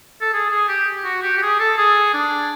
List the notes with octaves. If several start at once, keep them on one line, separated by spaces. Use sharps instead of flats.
A4
G#4
G#4
G4
F#4
G4
G4
G#4
A4
G#4
D4